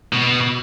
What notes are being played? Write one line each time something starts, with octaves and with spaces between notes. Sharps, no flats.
B2